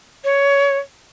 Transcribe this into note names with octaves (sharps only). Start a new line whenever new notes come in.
C#5